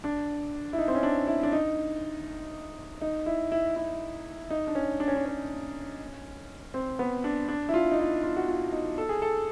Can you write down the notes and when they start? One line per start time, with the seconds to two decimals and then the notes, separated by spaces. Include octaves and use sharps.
0.04 D4
0.73 E4
0.78 D#4
0.88 C4
0.95 C#4
1.03 D4
1.27 E4
1.43 D4
1.52 D#4
3.01 D#4
3.26 E4
3.52 E4
3.76 E4
4.50 D#4
4.67 D4
4.75 C#4
5.00 D4
5.08 C#4
5.15 D4
5.25 C#4
6.74 C4
6.99 B3
7.24 D4
7.48 D4
7.69 E4
7.74 F4
7.92 D#4
7.99 E4
8.24 F4
8.36 F#4
8.48 F4
8.72 D#4
8.98 A4
9.09 G#4
9.22 A4